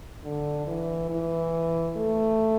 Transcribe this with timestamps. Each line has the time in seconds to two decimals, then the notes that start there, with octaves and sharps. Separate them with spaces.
0.23 D3
0.67 E3
1.10 E3
1.97 A3